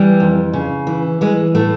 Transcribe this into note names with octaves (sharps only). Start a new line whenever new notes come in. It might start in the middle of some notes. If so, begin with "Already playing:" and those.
Already playing: E3 G3
F2
C#3
E3
E3 G#3
A2 A3